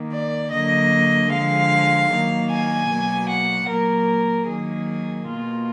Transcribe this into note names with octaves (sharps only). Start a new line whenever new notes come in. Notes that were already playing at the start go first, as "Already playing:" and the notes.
Already playing: D#3 A#3
D5
D3 F#3 A#3 D#5
D3 F3 G#3 F5
D#3 F#3 A#3
G#5
B2 F#3 A#3
F#5
A#2 F#3 A#3 A#4
D#3 F#3 A#3 G#4
B2 A#3 F4